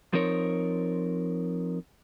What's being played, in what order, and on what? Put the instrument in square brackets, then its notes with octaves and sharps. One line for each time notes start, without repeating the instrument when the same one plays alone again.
[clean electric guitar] F3 C4 D#4 A#4 C#5